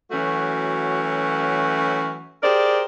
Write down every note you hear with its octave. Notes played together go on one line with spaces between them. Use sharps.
E3 F#3 A3 C#4 F#4
G4 G#4 A#4 C5 D5